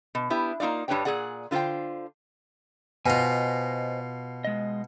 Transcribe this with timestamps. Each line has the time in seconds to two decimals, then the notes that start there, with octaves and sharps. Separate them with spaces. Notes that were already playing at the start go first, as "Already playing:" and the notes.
0.15 B2
0.30 B3 D4 E4 G4
0.60 A#3 B3 D#4 F4 D5
0.88 G2 G3 D4 B4 C#5 G5
1.05 A#2 G3 G#4 D5 F#5
1.51 D3 F4 A4 C5 G5
3.06 B2 F4 C5 D#5 G#5
4.45 G#3 D#5